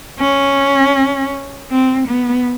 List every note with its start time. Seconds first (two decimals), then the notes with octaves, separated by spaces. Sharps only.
0.20 C#4
1.71 C4
2.08 B3